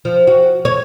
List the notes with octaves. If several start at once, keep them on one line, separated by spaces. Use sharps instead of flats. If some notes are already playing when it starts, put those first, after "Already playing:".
F3
F#4
C#5